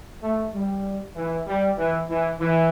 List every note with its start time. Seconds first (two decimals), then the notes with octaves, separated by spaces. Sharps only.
0.23 A3
0.54 G3
1.16 E3
1.47 G3
1.78 E3
2.09 E3
2.40 E3